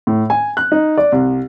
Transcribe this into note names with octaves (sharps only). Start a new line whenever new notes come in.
A2
G#5
F#6
D#4
D5
C2